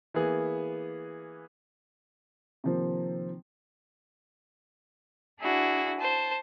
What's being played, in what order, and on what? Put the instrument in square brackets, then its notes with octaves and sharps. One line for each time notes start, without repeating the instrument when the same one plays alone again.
[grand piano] E3 A#3 B3 G#4
C3 D#3 F3 A#3 C4
[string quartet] D4 E4 F#4 G#4
C5 A5